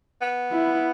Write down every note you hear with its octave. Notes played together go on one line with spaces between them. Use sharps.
B3
E4